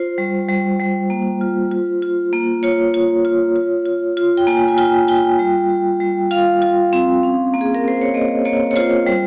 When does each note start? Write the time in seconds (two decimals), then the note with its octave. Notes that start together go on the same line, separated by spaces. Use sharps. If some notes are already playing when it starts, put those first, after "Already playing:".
Already playing: F4 C5
0.18 G3
0.49 G3
0.80 G3
1.10 A#3
1.41 F4
1.71 F4
2.02 F4
2.33 A#3
2.63 F4 C#5
2.94 F4
3.25 F4
3.56 F4
3.86 F4
4.17 F4
4.37 G5
4.47 A#3 G#5
4.68 G#5
4.78 F4 G5
5.08 F4 G5
5.39 G3
5.69 G3
6.01 G3
6.31 F4 F5
6.62 F4
6.93 C4
7.23 C#4
7.54 A#3
7.61 G#4
7.75 A#4
7.84 A#3 C5
8.02 C#5
8.14 A#3 D#5
8.45 A#3 C#5
8.71 C#5
8.76 F4 C5
9.06 G3